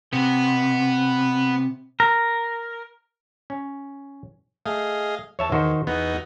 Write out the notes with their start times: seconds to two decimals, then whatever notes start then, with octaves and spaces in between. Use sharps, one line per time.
0.13 C3 B3
2.00 A#4
3.50 C#4
4.66 A3 G#4 D#5 F5
5.39 E2 C#5 E5 A5
5.52 D#3 F#4 C5
5.87 E2 B3 D#4 F#4